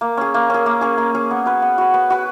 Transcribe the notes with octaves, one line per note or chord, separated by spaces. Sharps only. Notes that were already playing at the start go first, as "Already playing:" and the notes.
A#3
C#4 G#4
A#3
C#4 G#4
A#3
C#4 G#4
A#3
C#4 G#4
B3
F#4 B4
B3
F#4 B4
B3
F#4 B4